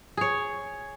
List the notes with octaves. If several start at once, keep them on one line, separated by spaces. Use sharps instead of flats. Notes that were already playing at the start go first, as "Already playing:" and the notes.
G#4 C#5